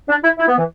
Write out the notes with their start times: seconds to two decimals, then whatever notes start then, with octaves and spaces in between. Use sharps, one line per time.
0.09 D4
0.23 E4
0.38 E4
0.48 B3
0.58 E3